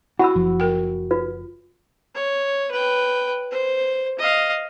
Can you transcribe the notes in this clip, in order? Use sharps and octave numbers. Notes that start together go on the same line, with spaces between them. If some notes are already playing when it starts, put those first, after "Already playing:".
E4 F#4 F#5 B5 E6
F#1 F3
A#4 G5
F4 B4
C#5
B4 G5
C5
D#5 F5